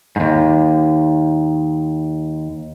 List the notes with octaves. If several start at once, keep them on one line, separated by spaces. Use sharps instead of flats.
D#2 G#2